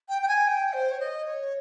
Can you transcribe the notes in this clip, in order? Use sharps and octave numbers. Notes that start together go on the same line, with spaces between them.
G5
G5
G#5
G5
C5
C#5
D#5
C#5